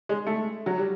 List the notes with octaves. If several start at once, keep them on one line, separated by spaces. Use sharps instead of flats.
G#3
A3
F#3
G3